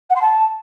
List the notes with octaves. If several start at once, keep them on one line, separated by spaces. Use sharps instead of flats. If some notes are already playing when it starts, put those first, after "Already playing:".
F#5
C6
A5